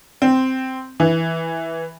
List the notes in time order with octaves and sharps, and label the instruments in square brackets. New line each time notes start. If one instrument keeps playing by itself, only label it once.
[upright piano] C4
E3